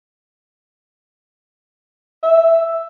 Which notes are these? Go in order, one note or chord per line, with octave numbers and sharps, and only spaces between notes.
E5